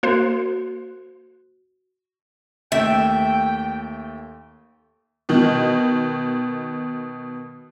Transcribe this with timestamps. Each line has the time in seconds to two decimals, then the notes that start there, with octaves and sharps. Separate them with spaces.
0.03 A#3 F#4 C5
2.72 D#2 A3 A4 E5 G5
5.29 B2 D#3